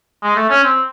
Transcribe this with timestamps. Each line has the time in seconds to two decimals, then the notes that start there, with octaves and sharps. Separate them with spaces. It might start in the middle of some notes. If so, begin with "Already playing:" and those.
0.23 G#3
0.36 A3
0.50 C#4
0.64 C4